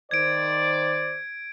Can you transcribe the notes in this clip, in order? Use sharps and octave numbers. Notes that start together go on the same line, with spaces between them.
D#3 C5 D5 G#6 D7